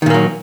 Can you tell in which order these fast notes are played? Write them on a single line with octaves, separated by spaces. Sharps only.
D#3 A#2 A#3 F#3